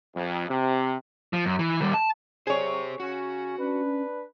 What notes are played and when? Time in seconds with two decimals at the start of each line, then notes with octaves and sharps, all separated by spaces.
0.15 F2
0.49 C3
1.33 F3
1.46 F#2
1.59 E3
1.81 D#3 G3
1.94 A5
2.47 F#3 G4 G#4 C5 C#5
3.00 C#3 C#4 F#4
3.58 C#4 D4 B4